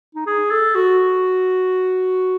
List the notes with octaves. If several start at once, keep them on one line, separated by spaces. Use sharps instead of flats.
D#4
G#4
A4
F#4